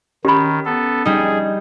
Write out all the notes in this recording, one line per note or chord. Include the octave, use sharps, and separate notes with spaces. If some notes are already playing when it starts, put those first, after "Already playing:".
D#3 C#4 G4 B5
B3 A4
G3 D#4 G#4